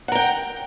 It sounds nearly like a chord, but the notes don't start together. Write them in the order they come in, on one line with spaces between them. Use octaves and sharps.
F#5 A#4 G5